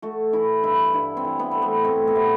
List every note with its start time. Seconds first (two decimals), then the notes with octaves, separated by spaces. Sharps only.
0.02 A3 F#4
0.33 E3 E4
0.63 G2 E4
0.93 G2 E4
1.17 C4
1.24 E3
1.39 B3
1.51 A3 C4
1.62 B3
1.84 A3 C4
2.07 B3
2.15 C3